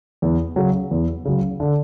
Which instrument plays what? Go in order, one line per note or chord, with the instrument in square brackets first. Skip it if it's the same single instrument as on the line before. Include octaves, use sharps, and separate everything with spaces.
[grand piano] E2
C#3 F#3
E2
C#3 F#3
D3